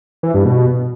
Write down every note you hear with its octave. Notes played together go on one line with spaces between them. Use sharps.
E3
G2
B2